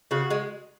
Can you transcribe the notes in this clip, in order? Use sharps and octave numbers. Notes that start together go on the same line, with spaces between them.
C#3 F#4
G#3